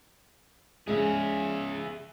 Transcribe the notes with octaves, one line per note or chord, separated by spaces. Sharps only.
C#3 G#3 G#4 E5